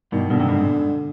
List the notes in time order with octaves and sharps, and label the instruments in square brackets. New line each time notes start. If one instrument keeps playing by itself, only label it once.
[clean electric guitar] G2 B2 [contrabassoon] D#3
[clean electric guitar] G2 B2 [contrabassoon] D3
[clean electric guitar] G#2 C3
G2 B2
G#2